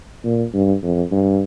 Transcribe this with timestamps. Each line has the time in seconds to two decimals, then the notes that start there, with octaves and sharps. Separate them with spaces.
0.24 A#2
0.53 G2
0.83 F2
1.12 G2